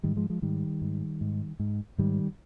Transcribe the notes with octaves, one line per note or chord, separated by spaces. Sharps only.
G#2 D#3 G3
F3 G#3
F3 G#3
G#2 D#3 G3
G#2
G#2
G#2
G#2 D#3 G3